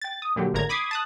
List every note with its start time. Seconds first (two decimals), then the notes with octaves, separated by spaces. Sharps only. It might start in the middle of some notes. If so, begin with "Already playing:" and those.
0.02 G5 A6
0.22 D#6
0.36 A#2 D3 F#3 G4
0.53 G#1 A2 D3 A#4 A#5 G#6
0.69 B5 D6 D#6 G#6 B6 C7
0.91 A5 D#6 F#6